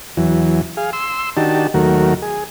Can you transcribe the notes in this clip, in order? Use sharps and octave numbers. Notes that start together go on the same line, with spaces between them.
E2 E3 F#3
G#4 F5
C6 E6
D#3 D4 D#4 F#4 G4 A5
D#2 D#3 F#3 A3 F#4 A#4
G#4